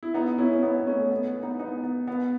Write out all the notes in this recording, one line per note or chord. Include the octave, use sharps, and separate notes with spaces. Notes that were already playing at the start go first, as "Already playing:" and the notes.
E4
B3 D#4
C#4 E4
C#4
B3 D#4
B3
A3 C#4
B3
B3
B3 D#4
B3 D#4
B3
B3